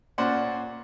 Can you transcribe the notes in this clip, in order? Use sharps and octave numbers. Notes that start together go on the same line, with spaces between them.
A#2 C#4 C5 D5 F#5